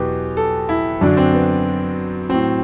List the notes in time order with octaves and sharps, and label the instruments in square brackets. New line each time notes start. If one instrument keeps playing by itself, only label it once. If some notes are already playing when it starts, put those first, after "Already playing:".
Already playing: [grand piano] E2 B2 F#3 G4
A4
E4
F#2 D3 F#3 D4
C4
B3
A2 F#3 C4